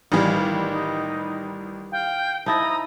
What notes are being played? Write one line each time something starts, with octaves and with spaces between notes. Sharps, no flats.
A1 D#3 G3 G#4 F5
D#4
F5 G5
D#4 E4 D#5 A5 D#6
A#5